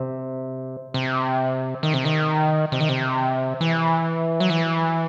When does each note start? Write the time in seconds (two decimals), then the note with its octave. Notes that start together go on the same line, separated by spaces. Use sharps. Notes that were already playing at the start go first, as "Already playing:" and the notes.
Already playing: C3
0.94 C3
1.83 D#3
1.94 C3
2.05 D#3
2.72 C3
2.81 D#3
2.89 C3
3.61 E3
4.40 F#3
4.50 E3